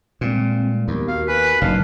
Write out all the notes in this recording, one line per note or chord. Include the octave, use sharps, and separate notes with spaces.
A#2 G3 G#3 C4
D#2 B3 A#4
F#4 A#4 F5
B4 G#5
F#1 B2 D#4 F5 A5